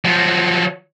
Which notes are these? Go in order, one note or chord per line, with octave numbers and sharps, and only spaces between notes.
F3 F#3